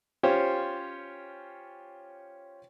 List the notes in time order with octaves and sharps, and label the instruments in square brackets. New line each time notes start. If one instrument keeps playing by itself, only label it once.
[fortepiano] C#4 F4 G4 C5 C#5